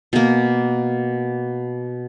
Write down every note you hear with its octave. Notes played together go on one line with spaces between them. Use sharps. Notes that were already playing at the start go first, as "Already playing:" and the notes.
B2 A#3